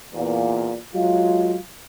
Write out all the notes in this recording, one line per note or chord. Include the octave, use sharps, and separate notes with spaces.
E2 A#2
F#3 G#3 F4